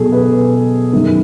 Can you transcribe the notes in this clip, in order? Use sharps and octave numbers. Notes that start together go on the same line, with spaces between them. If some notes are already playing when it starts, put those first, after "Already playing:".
Already playing: B2 F#3 G#4 A4
B4
F#2 D#3 F#3